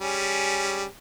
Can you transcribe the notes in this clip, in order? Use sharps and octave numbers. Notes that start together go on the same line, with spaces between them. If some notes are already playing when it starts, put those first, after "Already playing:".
G3 C#4 G#4